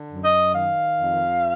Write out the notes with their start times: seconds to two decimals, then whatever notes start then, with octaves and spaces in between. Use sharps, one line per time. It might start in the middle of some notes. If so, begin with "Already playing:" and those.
Already playing: D3
0.09 F#2
0.23 D#5
0.54 D#3 F5
0.99 F2